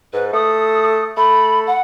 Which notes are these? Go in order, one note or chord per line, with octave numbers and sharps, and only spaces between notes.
G#2 B4
A3 D#6
A3 B5
F#5